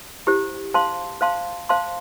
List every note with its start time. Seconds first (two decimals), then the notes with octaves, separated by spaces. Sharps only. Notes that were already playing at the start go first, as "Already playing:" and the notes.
0.27 E4 G4 C5
0.74 C5 F5 A5 C6
1.21 C5 F5 A5 C6
1.69 C5 F5 A5 C6